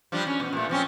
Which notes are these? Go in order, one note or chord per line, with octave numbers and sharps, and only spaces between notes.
F3 G3 D4
C#4
B2
A#2 A3
F3 C4 C#4